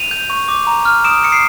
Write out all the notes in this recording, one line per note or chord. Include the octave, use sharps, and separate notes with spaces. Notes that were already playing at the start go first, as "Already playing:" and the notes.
Already playing: D#7 F7
G6
C#6
D6
A#5
F6
D#6 D7 E7
D#6 C#7
C7 D7